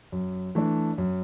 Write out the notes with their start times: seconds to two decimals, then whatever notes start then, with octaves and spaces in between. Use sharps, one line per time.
0.12 F#2
0.55 E3 A3 D4
0.98 F#2